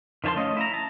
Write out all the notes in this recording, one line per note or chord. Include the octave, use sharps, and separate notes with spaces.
D#3 F3 C#5 A5 C6
A3 C#4 F4 D#5
E4 A#5
A5 A#5